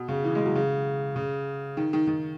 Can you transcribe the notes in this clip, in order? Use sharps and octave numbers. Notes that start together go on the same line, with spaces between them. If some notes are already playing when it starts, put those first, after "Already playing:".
Already playing: B2
C#3
E3
G#3
F#3
C#3
C#3
D#3
D#3
D#3